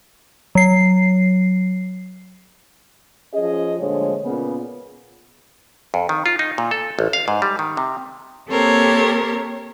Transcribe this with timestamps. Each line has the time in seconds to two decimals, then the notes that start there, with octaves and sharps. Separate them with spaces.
0.55 F#3 C7
3.34 F3 C#4 G#4 D#5
3.80 D2 A#2 D3 F3 G#3 C#5
4.24 A#2 C#3 A#3 B3
5.94 F2
6.09 D#3
6.26 F4
6.39 D#4
6.58 A#2
6.71 A4
6.99 A1
7.13 F5
7.28 G#2
7.42 G3
7.59 D#3
7.77 C3
8.50 A#3 C4 G4 A4 A#4 C#5